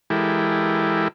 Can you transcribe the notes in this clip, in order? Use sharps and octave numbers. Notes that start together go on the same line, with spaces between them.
E3 G#3 E4 G4 A4 A#4